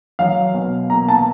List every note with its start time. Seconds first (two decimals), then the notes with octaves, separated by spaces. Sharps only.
0.19 F#3 F5
0.54 B2
0.90 A#3 A#5
1.08 A5